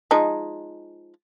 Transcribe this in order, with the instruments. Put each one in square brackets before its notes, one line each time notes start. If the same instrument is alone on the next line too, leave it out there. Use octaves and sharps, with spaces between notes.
[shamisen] F3 G#3 D#4